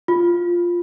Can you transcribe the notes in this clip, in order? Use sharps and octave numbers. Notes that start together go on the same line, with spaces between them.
F4